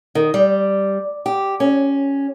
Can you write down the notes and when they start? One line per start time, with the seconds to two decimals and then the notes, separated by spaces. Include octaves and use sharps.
0.15 D#3
0.34 G3
1.26 G4
1.60 C#4